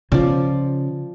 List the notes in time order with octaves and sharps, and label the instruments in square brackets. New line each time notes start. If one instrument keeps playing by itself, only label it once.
[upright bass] C#3 [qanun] F3 D5